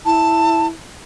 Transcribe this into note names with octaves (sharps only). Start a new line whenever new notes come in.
E4 A5